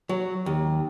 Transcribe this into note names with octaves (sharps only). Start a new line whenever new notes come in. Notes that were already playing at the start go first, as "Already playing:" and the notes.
F#3
D#2